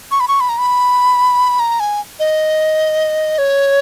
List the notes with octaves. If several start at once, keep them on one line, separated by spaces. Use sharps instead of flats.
C#6
B5
C#6
B5
A#5
B5
A#5
G#5
D#5
C#5